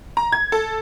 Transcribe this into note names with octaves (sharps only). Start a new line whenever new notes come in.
A#5
G#6
A4